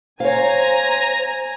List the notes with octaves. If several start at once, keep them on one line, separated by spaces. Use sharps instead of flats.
C5 C#5 F5 G#5 A#5